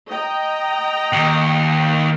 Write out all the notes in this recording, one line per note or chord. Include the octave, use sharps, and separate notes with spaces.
D#5 G5 A#5
D#2